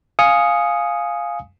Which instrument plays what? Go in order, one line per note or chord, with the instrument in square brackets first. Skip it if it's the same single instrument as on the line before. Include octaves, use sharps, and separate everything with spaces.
[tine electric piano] F5 G#5 D#6 C#7